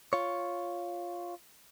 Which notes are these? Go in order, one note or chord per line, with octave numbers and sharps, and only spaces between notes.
F4 C#5